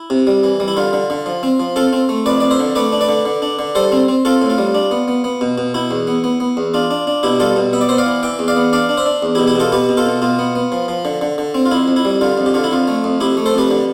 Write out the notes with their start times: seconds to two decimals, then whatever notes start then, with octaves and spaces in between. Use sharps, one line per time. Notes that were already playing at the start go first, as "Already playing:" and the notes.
Already playing: E4
0.10 C3
0.27 G3
0.44 E3
0.60 G3
0.68 E4
0.77 D3 F4
0.93 D3
1.10 D3
1.26 F3
1.43 C4
1.60 F3
1.76 C4 F4 A4
1.93 C4
2.09 A3
2.26 F2 B4 D5
2.40 F2 D5
2.51 C5 E5
2.59 D3
2.75 A3 B4 D5
2.92 D4
3.01 B4 D5
3.09 D3
3.26 D3
3.42 D4
3.59 D3
3.75 G3 A4 C5
3.92 C4
4.08 C4
4.25 C4 F4 A4
4.42 A2
4.50 F4
4.58 G3
4.75 D4
4.91 B3
5.08 B3
5.24 B3
5.41 B2
5.58 B2
5.74 B2 E4
5.91 E2
6.07 B3
6.24 B3
6.40 B3
6.57 E2
6.74 D4 F4
6.91 D4
7.07 D4
7.23 B2 E4 G4
7.40 G3 F4 A4
7.56 B2
7.73 B3 E5
7.81 D5
7.89 B3 C5 E5
7.98 D5 F5
8.06 E3
8.23 E3 E5 G5
8.39 E2
8.48 D5 F5
8.56 B3
8.73 D4 D5 F5
8.89 D4
8.97 C5 E5
9.06 D4
9.23 E2
9.35 E4 G4
9.39 B2
9.47 E4 G4
9.55 B2 F4 A4
9.72 B2 G4 B4
9.89 B2
9.97 F4 A4
10.06 B2
10.22 B2 F4
10.39 B3
10.56 B3
10.72 F3
10.88 F3
11.05 D3
11.21 D3
11.38 D3
11.54 C4
11.66 F4
11.71 F2 E4
11.88 F2
11.96 E4
12.05 G3
12.21 D3 F4
12.38 F2
12.46 G4
12.54 D3 F4
12.64 E4
12.71 F2 F4
12.88 A3
13.04 F2
13.20 F2 E4 G4
13.37 A3
13.46 A4 C5
13.54 F2 G4 B4
13.70 D3